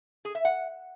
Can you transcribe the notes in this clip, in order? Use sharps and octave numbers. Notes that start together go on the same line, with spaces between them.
G#4
E5
F#5